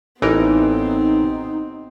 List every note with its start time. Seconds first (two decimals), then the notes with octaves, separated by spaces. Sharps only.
0.22 A1 E3 B3 C4 D#4 A#4